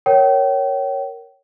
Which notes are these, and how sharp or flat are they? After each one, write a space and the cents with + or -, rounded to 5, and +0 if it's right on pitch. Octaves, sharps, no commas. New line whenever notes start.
A#4 +0 C#5 +0 G5 -35